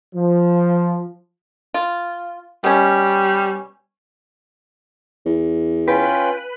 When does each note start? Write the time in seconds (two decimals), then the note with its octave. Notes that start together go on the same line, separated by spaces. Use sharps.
0.16 F3
1.74 F4
2.64 B2 G3 C#4
5.26 E2
5.88 C#4 F4 B4 G5